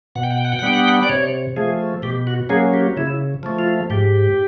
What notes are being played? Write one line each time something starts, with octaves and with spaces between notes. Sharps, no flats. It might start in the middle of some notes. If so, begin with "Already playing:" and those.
B2 F#5
G5
F#5
G5
F#5
G5
F#5
G3 B3 D4 G5
F#5
G5
F#5
D5
C3 C#5
F3 A3 G#4
B2 G4
F#4
F#3 A#3 C#4 G#4
G4
C#3 E4
F3 A3
F4
G#2 G4